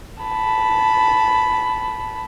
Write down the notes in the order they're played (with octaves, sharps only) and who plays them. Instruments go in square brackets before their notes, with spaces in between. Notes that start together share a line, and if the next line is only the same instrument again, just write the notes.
[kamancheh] A5 B5